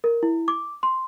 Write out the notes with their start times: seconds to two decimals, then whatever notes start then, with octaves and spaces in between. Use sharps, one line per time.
0.04 A#4
0.23 E4
0.48 D6
0.83 C6